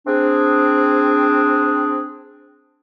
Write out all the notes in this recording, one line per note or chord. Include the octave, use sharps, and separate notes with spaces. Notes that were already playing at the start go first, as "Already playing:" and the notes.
C4 D4 G#4